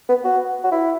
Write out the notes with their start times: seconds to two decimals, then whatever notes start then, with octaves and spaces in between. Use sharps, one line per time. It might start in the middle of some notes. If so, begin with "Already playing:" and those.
0.09 B3
0.24 F#4
0.64 F#4
0.72 E4